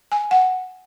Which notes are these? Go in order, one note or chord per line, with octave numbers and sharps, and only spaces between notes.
G#5
F#5